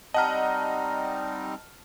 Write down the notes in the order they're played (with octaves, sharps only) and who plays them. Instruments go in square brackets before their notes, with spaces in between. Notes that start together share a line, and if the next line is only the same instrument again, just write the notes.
[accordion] G3 C4 D#4 [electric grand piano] D#5 F#5 A#5 [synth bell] A5 F6